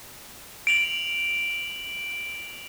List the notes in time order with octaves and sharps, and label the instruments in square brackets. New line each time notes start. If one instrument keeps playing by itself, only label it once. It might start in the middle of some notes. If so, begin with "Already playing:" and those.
[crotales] D7 F7 F#7